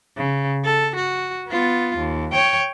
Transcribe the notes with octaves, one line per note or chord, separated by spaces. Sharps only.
C#3
A4
F#4
B3 F4
D#2
C#5 G5